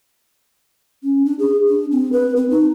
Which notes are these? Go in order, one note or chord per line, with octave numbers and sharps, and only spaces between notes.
C#4
D4
G#4
D4
C4
B4
C4
D#4